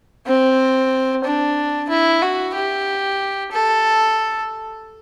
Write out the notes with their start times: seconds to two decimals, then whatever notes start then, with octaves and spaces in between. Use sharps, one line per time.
0.26 C4
1.25 D4
1.89 E4
2.22 F#4
2.55 G4
3.52 A4